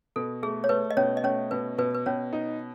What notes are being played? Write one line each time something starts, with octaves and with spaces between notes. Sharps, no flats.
B2 A4
A3 G#4
C#5
A3 B4
D#5
B2 C#4 C#5
D#5
A3 C#4 C#5
B2 B4
B2 B4
B4
B2 C#4 C#5
D#4